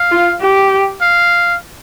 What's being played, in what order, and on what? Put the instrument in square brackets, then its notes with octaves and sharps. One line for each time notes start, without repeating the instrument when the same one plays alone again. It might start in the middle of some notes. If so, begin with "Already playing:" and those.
Already playing: [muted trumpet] F5
[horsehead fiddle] F4
G4
[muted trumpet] F5